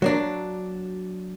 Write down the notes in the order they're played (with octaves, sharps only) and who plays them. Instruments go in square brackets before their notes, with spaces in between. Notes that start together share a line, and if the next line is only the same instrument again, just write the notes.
[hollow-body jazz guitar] F#3 A#3 D4